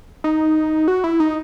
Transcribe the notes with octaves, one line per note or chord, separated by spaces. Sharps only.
D#4
F#4
E4
D#4